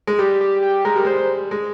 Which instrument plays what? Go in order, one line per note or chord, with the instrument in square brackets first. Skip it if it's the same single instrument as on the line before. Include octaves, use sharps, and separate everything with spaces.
[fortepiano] G#3
[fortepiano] G3 [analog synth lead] G4
[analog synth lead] G4
G4
[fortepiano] G#3 [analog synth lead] A#4
[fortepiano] G3
[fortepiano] G#3 [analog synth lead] C5
[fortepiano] G#3